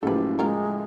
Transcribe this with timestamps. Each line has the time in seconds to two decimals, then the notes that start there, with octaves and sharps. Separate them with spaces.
0.03 F#1 A2 C#3 F3 G4 A4 B4
0.39 G#3 F4 G4 A#4